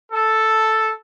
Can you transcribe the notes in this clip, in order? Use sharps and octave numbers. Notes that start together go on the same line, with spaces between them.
A4